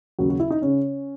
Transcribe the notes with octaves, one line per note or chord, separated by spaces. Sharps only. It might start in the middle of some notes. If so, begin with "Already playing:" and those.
D#2 C#3 F#3 F#4
F#4
E4
D#4
C#3 C#4